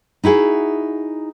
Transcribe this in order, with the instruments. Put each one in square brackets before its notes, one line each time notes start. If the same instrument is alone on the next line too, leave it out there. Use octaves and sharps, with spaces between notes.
[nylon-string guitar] D#4 E4 F#4 G#4